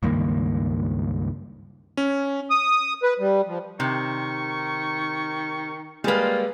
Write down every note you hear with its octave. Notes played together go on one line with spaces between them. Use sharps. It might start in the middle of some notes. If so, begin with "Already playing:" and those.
C#2 G2 D#3 A#3
C#4
D#6
B4
G3
F3
C3 D#3 C#6
G3 G#3 A#3 F4 B4